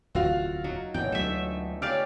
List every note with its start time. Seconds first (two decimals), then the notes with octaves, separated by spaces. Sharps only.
0.15 D1 E2 F4 F#4 E5 F5
0.64 F#3 D#4 A4 A#4
0.94 E1 E2 A#2 B3 C#4 F4 G5
1.12 D2 F3 F#3 A3 E5
1.82 C#4 D#4 G4 D5 F5 F6 D7